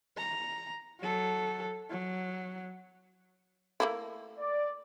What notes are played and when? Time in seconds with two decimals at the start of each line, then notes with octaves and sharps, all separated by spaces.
0.17 A#5
1.00 F#3 A4
1.90 F#3
3.80 A3 A#3 E4
4.39 D5